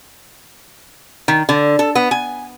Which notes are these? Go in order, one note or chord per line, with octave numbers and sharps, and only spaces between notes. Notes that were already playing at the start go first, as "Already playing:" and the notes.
D#3
D3
A4
B3
G#5